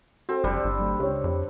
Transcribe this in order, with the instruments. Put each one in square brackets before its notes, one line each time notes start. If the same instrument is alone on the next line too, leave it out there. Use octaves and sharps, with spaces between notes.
[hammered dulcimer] C4 [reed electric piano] F#4 A4
[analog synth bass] F#1 [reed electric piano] D#2 [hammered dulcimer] D3 G3
[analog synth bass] G1
[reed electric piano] F#3 A3
[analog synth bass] C#2 [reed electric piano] G4 C#5
[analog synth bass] F2